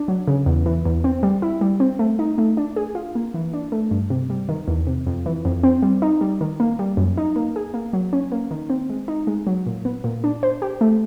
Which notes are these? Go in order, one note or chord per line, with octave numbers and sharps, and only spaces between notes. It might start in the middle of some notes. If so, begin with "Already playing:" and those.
Already playing: D4
F#3
C#3
E2
E3
E2
C4
G3
E4
G3
C4
A3
D#4
A3
D4
G#4
F4
A#3
E3
D4
A3
G2
C3
G3
D#3
E2
C3
F2
E3
F2
C4
G3
D#4
G3
D#3
A#3
G3
F#2
D#4
A#3
G#4
A#3
F#3
C#4
A#3
D#3
C4
G#3
D#4
G#3
F#3
A#2
B3
A#2
D4
C5
G4
A3